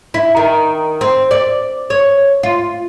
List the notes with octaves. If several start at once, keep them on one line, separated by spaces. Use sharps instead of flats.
E4
D#3
C4
D5
C#5
F4